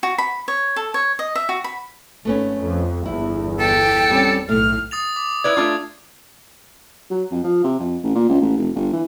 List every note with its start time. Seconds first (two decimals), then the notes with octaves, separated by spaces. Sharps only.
0.03 F#4
0.18 B5
0.48 C#5
0.76 A4
0.94 C#5
1.19 D#5
1.35 E5
1.49 F#4
1.64 B5
2.25 G#1 A3 B3 C#4
2.58 F2
3.06 G1 E2 E4
3.59 A4 G5
4.10 G3 C4 C#4
4.49 B1 A2 A3 F6
4.91 D#6 A6 F7
5.16 D6
5.44 E4 B4 D5 G#6
5.57 A3 D4 F4
7.11 F#3
7.31 F2
7.44 F3
7.64 C3
7.80 F2
8.03 A1
8.15 A#2
8.30 C#2
8.41 A1
8.57 F1
8.75 G1
8.93 E3